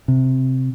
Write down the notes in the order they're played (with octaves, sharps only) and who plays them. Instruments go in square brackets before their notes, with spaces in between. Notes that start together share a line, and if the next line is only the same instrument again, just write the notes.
[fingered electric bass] C3